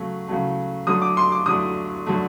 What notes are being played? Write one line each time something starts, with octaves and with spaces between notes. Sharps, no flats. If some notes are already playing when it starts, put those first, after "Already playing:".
Already playing: C#3 F#3 A3
C#3 F#3 A3
D3 F#3 A3 D#6
D6
C6
D6
D3 F#3 A3 D#6
D3 F#3 A3